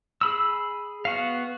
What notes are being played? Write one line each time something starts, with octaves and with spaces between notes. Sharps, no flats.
G#4 B5 E6
B3 F#4 F5